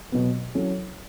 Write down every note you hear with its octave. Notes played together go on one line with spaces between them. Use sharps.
B2 F#3 B3
F#3 C#4 E4 A4